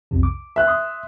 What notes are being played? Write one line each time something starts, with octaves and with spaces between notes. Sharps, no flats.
B1 F2 C3
D6
E5 F#6
C6 D#6